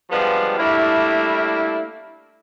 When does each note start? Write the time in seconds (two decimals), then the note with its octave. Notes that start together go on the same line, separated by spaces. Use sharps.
0.11 F3 G3 G#3 B3 D4 F4
0.58 G3 A3 A#3 D4 E4